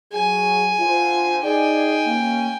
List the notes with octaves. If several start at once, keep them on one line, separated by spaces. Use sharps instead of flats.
F#3 G#4 G#5
D3 F4 C5
D#4 G#4 D5 G5 G#5
D#2 A#3 C#4 F5